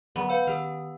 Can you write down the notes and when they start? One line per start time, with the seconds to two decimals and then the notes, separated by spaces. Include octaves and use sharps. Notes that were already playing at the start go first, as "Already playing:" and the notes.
0.16 D3 F#3 B3
0.29 B4 F5 E6
0.47 D#3 G4 F5 E6